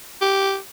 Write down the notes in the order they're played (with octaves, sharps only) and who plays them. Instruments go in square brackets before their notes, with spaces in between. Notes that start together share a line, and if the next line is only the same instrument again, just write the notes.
[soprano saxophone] G4